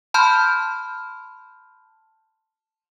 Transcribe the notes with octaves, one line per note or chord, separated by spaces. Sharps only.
A5 B5 C6 F6 G6